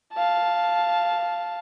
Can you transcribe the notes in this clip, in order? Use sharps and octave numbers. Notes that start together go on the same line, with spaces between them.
F5 A5